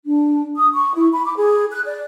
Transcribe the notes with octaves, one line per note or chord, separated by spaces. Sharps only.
D4
D#6
C#6
E4
B5
D6
G#4
F#6
D5